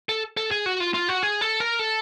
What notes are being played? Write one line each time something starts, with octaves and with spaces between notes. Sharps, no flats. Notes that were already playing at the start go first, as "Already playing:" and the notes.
A4
A4
G#4
F#4
F4
F4
F#4
G#4
A4
A#4
A4